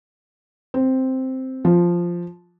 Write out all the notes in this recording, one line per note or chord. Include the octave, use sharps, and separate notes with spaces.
C4
F3